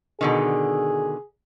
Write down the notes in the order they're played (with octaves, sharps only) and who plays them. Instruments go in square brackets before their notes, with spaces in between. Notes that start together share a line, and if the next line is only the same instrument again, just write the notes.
[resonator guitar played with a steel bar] B2 D3 D#3 [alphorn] G#4